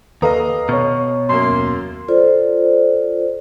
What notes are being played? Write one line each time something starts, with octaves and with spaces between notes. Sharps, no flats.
D#2 A4 B4 D#5 F5 A#5 D#6
B2 C#5 C#6 F6
F#2 A#3 C6
D#2
F4 A4 C5 D5